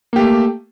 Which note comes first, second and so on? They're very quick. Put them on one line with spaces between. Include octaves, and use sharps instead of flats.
A#3 G4 A3